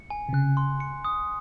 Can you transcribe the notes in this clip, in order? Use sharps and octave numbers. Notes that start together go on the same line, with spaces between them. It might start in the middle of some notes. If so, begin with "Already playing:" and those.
Already playing: C#7
G#5
C3
C#3 F#6
C6
C#7
D#6